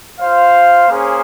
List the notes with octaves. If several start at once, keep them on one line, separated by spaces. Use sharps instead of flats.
F4 C5 F5
A#3 C#4 G#4 C5